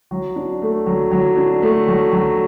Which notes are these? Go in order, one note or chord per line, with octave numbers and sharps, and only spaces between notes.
F#3
D4
A3
F#3
F#3
D4
A3
F#3
F#3